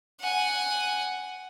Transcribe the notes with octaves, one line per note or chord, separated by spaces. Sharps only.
F#5 G#5